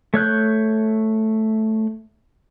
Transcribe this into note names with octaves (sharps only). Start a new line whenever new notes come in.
A3 C#5 F#6 G6